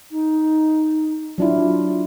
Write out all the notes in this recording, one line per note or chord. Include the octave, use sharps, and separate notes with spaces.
D#4
F#3 D4 E4 F4